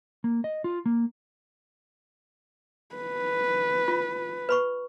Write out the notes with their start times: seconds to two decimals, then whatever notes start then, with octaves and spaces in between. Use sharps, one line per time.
0.24 A#3
0.44 D#5
0.64 F4
0.86 A#3
2.96 B4
3.88 F4
4.49 B4 B5 C#6